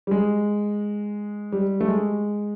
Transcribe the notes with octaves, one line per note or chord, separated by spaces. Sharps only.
G3
G#3
G3
A3
G#3